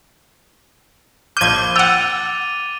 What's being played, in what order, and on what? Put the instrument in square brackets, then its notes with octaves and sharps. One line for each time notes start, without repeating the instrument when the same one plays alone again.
[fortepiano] A#1 F6 [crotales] D6 D#7 G7 [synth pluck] G6 G#6
[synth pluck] F#5 G5 [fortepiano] E6 [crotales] A6 F7